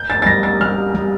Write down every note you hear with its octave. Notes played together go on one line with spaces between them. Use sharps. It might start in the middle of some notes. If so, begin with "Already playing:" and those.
Already playing: G6
A6
A6
G3 A#6
A6
G3 F6
G3